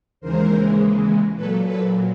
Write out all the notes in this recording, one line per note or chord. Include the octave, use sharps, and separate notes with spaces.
D#2 C#3 E3 G#3 A#4 C5
A#2 F#3 A4 B4
A4 B4